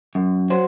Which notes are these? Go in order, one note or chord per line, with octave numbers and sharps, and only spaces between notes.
F#2
F#3 C5